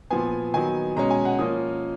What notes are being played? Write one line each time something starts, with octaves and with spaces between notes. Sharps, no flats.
A#2 F3 B3 G#5
D#3 F#3 B3 G#5
B2 G#3 C#4 A#5
G#5
F#5
F3 A#3 C#4 D#6